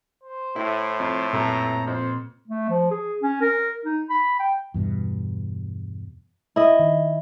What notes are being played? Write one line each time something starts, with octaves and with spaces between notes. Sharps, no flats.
C5
A2 E4
F2
F#2 A#2 C4 A4 B4 A#5
F2 C5
A3
F3
G#4
C#4
A#4
D#4
B5
G5
E2 G2 B2
E4 D#5
D#3